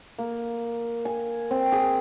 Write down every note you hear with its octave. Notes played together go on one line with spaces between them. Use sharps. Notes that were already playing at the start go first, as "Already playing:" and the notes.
A#3
G#5
C4
G#4